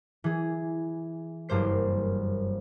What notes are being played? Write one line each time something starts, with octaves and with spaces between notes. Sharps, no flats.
E3 G#4
F#1 G2 A#3 C5 C7